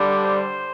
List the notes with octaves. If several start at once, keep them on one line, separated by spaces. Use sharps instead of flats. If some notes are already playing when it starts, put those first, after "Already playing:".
Already playing: D3 G3 D4
C5